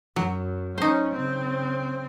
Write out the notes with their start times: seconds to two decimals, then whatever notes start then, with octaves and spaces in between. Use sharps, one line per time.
0.16 F#2 F#3
0.78 C#4 D#4 C5
1.13 C#3 C4